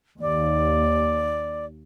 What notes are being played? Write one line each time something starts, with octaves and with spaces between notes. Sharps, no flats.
D#2 D5